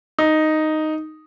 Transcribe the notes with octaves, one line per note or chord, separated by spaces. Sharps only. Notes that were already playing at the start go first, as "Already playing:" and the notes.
D#4